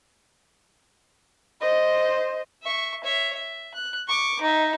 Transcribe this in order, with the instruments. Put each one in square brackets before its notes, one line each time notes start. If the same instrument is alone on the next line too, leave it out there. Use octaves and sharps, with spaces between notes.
[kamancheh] C5 D#5
[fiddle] E5 C#6
C#5 E5
E5
F#6
C#6 D6
D#4 E5